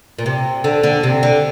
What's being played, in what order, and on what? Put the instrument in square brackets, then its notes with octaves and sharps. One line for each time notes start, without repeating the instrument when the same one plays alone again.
[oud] A#2
C3
D3
D3
C3
D3